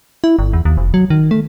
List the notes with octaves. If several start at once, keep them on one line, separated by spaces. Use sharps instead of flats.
E4
G1
E2
D#2
F1
F#3
D#3
A3